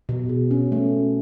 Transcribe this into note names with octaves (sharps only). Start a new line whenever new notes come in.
B2
G#4
C#4
A3